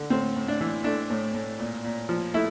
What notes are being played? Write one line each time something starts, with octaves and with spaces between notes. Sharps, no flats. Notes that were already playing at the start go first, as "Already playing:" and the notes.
Already playing: D3
A2 C4
A2
D4
E3
A3 D4
A2
A2
A#2
A#2
F3
A3 E4